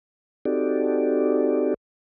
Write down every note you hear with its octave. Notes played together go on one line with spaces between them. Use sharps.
C4 D#4 F#4 G4 A4 D5